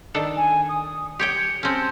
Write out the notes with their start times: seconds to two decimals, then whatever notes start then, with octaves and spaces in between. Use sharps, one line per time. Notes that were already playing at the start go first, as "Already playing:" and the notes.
0.14 D#3 D4 A4
0.36 G#5
0.68 D#6
1.19 G4 C#5 G5 C#7
1.63 C4 C#4 A5